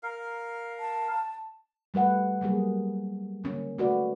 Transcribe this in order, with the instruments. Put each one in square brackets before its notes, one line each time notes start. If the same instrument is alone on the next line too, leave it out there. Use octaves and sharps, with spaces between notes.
[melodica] A#4 F5
[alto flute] A5
[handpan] G3 A3 B4 F#5
F#3 G3 A#3 G#4
D3 A#3 C#4
A3 F#4 B4 D5